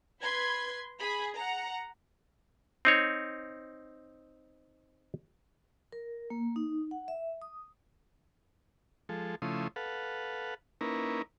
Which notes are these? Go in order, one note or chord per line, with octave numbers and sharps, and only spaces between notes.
B4 B5 C6 G#6
G#4 B5
F#5 A#5
C4 D#4 C#5
A#4
A#3
D#4
F#5
E5
D#6
F3 G#3 A4
C#3 F3 A3 E4 C6 D#6
A4 B4 F5 F#5
A#3 C#4 D#4 E4 A#4 B4